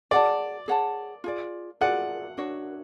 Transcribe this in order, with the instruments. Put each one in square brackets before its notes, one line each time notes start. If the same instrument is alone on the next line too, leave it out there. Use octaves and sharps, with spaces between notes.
[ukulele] G#4 C#5 F#5 A5 [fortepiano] D5
[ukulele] G#4 C#5 F#5 A5
F4 G#4 D5
[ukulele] F4 G#4 D5 [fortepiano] F#5
[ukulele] D4 F#4 C#5